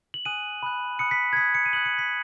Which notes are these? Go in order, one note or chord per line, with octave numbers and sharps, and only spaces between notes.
F#7
G#5 D#6 F#6 D#7
B5 D#6 F#6
B5 D#6 F#6 C#7
B6
G#6
B5 D#6 F#6 B6
C#7
D#7
B5 D#6 F#6 F#7
C#7
B6